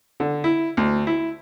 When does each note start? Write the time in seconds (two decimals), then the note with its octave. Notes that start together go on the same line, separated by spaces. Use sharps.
0.20 D3
0.44 E4
0.77 D2
1.07 E4